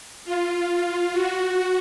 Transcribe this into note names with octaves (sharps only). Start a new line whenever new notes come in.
F4
F#4